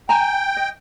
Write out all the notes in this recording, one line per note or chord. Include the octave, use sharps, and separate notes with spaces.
G5 G#5 A#5
D#5